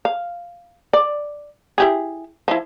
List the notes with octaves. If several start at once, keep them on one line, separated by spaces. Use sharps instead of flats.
F5
D5
E4 G4 G#4
F3 E4